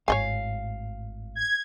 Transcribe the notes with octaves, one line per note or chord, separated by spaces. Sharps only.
G#1 A2 C#5 D#5 F5 G#5
G#6